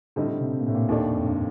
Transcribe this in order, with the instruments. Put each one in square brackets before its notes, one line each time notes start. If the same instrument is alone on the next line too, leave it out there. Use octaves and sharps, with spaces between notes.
[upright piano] A2 G3 C4 D#4 [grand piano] D3
[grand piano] D3
C3
C3
A#2
A2
A#2
[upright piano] D#2 D#3 A3 D4
[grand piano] F2
G2